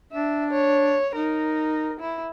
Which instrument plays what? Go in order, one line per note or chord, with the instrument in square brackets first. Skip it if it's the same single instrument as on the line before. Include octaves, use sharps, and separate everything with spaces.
[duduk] D4 [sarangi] E5
[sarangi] C#5
[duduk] D#4 [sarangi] A#4
[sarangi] E4